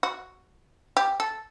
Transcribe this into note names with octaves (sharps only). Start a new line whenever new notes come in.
F#4
G4
A4